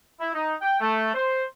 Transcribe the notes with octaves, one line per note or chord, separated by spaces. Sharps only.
E4
D#4
G5
A3
C5